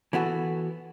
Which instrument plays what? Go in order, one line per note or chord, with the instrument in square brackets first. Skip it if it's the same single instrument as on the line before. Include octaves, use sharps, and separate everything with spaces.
[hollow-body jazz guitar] E3 B3 F#4 A4